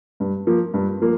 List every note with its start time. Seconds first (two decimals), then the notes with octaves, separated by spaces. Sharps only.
0.20 G2
0.47 F3 A#3
0.74 G2
1.01 F3 A#3